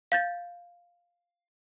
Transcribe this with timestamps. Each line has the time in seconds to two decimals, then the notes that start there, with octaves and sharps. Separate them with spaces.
0.12 F5 G6 A6